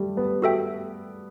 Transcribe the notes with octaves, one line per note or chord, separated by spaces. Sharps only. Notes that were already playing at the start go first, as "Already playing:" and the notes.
Already playing: G3 A3
B3
F#4 A4 E5 G5